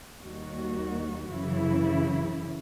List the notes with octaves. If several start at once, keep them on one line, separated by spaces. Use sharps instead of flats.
D#2 D#3 G3 F#4
F#2 C#3 E3 E4